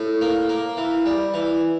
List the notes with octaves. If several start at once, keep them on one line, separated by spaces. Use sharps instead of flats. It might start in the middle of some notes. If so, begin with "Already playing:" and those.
Already playing: A2
A#3
A#3
E3
G3
E3